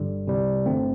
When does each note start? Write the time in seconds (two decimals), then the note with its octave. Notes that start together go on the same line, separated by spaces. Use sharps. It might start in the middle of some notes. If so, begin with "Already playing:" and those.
Already playing: G1 G2 D3 G3
0.27 C2 C3 G3
0.66 G1 G2 D3 A3 C4